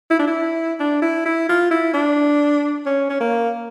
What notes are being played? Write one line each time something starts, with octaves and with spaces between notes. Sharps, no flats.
E4
D4
E4
D4
E4
E4
F4
E4
D4
C#4
C#4
A#3